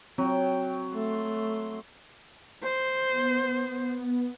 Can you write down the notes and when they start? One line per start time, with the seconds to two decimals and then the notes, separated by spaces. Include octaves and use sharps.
0.18 F#3 C4 G5
0.93 A3 C6
2.63 C5
3.11 B3